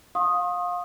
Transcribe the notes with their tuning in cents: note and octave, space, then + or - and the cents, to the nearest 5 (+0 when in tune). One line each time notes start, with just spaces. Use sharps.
F5 +25 C6 +45 D#6 +0